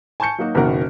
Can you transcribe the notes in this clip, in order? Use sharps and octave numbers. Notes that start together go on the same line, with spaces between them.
G#5 A5 C#6 G6 C#7
F#3 A#3 D#4 F#4
F#1 B2 D#3 A#4 F#5